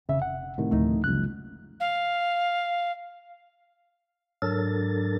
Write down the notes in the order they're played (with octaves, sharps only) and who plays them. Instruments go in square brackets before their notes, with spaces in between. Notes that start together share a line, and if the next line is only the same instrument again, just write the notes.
[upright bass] F1 [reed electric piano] C#3 E5
[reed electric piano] F#5
[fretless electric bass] A2 C3 D#3
[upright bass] D2 F3 [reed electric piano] A3 D#4
[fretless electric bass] F#1 C#2 [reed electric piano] F#6
[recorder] F5
[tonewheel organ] G#2 F#3 D4 A4 A#4 A6